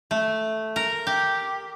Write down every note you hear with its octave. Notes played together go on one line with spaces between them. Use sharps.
A3
A#4
G4